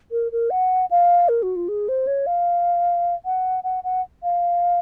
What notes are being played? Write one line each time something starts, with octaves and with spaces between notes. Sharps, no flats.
A#4
A#4
F#5
F5
A#4
F#4
F4
G#4
C5
C#5
F5
F#5
F#5
F#5
F5